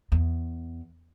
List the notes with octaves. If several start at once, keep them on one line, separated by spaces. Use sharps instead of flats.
E2